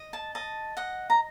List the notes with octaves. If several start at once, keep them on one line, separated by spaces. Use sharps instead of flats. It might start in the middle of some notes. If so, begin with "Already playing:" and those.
Already playing: D#5
A5
D#5 A5
D#5 F#5
A#5